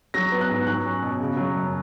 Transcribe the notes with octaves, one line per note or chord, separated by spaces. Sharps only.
F#3 A#6
B3
F#6
G#2
F#3 F#6
C#4
B2
C#3
F#3
F#2